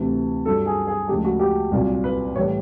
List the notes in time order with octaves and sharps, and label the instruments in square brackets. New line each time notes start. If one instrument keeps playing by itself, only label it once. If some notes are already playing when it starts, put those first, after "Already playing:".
Already playing: [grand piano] D2 C3 E3
G2 D3 F#3 A4
G#4
G#4
D2 C#3 F3 G#3 G4
F#4
G4
C2 A#2 F#3
B4
A2 E3 G3 C#5